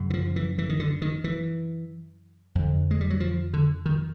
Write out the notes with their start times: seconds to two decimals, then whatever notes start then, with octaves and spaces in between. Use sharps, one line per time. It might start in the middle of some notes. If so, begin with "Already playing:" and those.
Already playing: F#2 C#3
0.10 E3
0.14 F3
0.36 E3
0.58 E3
0.69 D#3
0.80 D3
1.02 D#3
1.24 E3
2.55 F2 D3
2.91 G#3
3.01 G3
3.10 F#3
3.20 F3
3.54 D3
3.86 D#3